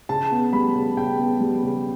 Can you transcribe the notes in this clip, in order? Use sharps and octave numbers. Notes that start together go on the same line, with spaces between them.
C#3 A5
B3
G3 B5
C#3
C#3 G5
B3
G3
C#3